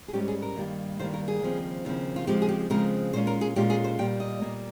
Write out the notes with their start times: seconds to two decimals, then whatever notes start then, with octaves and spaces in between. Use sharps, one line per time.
0.08 G#4
0.13 G#2 G3 C#4 G4
0.28 G#4
0.42 A#4
0.56 G2 D#3 G3 A#3
0.99 G2 D#3 G3 A#3 C5
1.14 A#4
1.28 G#4
1.42 D#2 C#3 F3 C4
1.85 D#2 C#3 F3 C4
2.16 F4
2.27 C#3 F3 G#3 C4 G4
2.42 G#4
2.49 G4
2.70 C#3 F3 G#3 C4 A#4
3.13 A#2 G#3 C#4 F4 C5
3.27 A#4
3.41 G#4
3.56 A#2 G#3 C#4 F4 G4
3.70 G#4
3.84 C5
3.99 A#2 G3 A#3 G5
4.20 D#5
4.41 A#2 G3 A#3